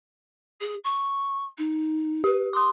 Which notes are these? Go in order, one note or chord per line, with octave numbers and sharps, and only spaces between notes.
G#4
C#6
D#4
G4 B4
C6 D6 D#6